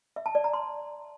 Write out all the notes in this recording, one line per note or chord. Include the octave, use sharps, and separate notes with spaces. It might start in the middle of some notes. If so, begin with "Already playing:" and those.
E5
A5
D5
A#5
C6